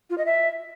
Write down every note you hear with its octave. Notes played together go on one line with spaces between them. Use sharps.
F4
D#5
E5